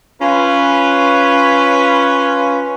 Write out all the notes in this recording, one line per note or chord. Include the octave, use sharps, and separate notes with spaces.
C#4 F4 B4